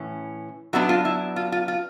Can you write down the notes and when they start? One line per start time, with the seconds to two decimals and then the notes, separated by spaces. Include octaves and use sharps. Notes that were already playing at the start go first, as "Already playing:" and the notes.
Already playing: A2 E3 C#4
0.73 F#3 B3 D4 E4 F#4
0.89 F4
1.05 E4
1.36 F4
1.52 F4
1.68 F4